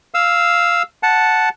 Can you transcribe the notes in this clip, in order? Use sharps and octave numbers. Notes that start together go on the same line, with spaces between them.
F5 E6
F#5 A5